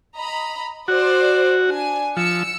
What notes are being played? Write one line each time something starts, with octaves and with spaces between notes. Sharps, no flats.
D#5 A#5 B5
F#4 C5 D5
D4 G#5
F3 E6 C#7